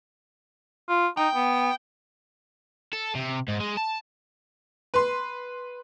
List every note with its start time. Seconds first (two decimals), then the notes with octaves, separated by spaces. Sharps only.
0.89 F4
1.17 D#4 G5
1.35 B3
2.93 A4
3.15 C3
3.48 G#2
3.60 G#3
3.77 A5
4.94 B4 C6